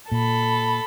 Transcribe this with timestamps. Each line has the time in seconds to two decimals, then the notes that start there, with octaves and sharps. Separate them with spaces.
0.12 A#2 A4 B5